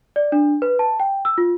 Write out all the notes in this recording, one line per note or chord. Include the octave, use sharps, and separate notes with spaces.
D5
D4
B4
A5
G5
E6
F4